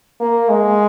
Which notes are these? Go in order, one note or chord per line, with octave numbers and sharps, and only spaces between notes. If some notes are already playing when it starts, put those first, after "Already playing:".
A#3
G#3